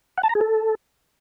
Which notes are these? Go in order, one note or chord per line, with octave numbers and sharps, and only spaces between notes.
F#5
A5
A#5
G#4
A4